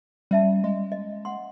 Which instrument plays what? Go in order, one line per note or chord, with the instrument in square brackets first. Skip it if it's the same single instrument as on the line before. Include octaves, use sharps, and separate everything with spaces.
[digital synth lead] G3 [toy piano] C#4 E5 A5
[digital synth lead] G#3
[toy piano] D#5
F#5 C6